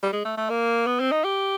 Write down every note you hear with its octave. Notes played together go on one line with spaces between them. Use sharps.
G3
G#3
A3
A3
A#3
B3
C4
D#4
G4